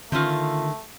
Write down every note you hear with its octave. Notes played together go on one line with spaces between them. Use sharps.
D3 D#3 A3 C4 C#4 F4